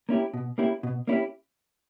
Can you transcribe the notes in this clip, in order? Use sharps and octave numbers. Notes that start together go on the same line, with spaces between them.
A#3 C#4 E4 G4
B2
A#3 C#4 E4 G4
B2
A#3 C#4 E4 G4